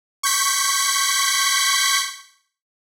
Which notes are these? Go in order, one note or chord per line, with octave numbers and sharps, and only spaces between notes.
C#6 G6 B6